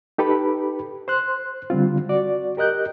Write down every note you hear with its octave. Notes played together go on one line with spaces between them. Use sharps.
D#4 G4 A4 B4 B5
C5 C6 F#6
D3 G3 C4 F4
F#4 D5
G4 A#4 D#5 F#6 G6